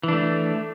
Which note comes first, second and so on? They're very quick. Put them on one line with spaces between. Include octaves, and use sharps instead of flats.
E3 D4 A3